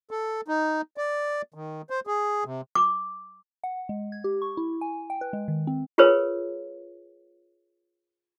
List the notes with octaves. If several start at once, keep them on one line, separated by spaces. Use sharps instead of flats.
A4
D#4
D5
D#3
C5
G#4
C3
D6
F#5
G#3
G#6
G4
C#6
E4
G#5
G5
B4
G#3
D#3
C4
F4 G#4 A#4 B4 C#5